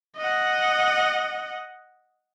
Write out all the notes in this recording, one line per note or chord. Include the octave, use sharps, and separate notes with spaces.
D#5 F#5